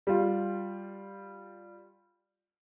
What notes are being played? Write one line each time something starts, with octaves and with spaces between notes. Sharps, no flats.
G3 F4